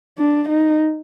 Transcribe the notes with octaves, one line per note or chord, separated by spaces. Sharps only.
D4
D#4